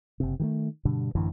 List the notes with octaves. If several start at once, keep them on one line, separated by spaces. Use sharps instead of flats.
F#1 C3
D#3 F#3 A3
G2 B2 D3
A1 F#2 D3 E3